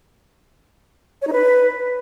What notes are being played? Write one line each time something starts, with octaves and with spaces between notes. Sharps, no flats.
C#5
D#4
B4